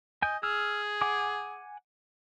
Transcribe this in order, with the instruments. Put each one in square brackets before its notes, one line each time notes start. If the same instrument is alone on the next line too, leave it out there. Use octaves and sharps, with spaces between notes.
[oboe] D#5 [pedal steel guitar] G#5 G6
[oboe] G#4 [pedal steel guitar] E6 F6
[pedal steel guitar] F#5 G#5 D6